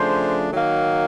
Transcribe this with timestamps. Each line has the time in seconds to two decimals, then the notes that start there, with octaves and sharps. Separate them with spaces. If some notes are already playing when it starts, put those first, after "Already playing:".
Already playing: C#3 F3 A3 D4 C5
0.52 D#3 F#3 A#3